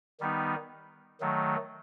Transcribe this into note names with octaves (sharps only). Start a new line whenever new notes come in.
D#3 G3 B3 D#4
D#3 F#3 A3